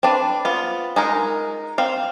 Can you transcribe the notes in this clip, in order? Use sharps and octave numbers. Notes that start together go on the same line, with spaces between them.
C4 D4 B4
B3 F4
G#3 D#4 A#4
C4 F5